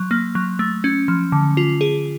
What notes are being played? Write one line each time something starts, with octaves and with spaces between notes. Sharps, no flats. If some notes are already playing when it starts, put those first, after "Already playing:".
Already playing: F#3
A#3
F#3
A3
C#4
F3
D3
F4
G#4